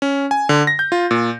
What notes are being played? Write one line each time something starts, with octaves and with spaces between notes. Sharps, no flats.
C#4
G#5
D3
A#6
G6
F4
A#2